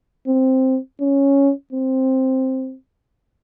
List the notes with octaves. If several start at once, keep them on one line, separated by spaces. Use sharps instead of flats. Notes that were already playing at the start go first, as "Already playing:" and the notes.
C4
C#4
C4